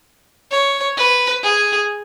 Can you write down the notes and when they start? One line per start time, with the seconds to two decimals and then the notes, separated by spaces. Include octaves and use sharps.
0.51 C#5
0.97 B4
1.43 G#4